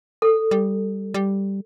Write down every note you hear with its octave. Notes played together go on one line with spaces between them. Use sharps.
A4
G3
G3